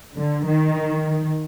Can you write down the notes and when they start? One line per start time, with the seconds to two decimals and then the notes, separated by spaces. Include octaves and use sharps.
0.17 D3
0.46 D#3